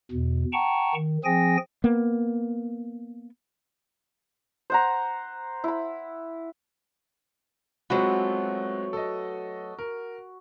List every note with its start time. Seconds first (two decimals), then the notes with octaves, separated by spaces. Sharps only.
0.11 E2 B2
0.53 F#5 G5 A5 A#5 C#6
0.94 D#3
1.25 F3 C4 G#4 G5 G#5 A#6
1.84 A#3 B3
4.70 C5 F#5 A#5
5.64 E4 B5
7.90 F#3 G#3 A3 B3 C4 F4 F#4
8.93 A4 D#5
9.79 A#4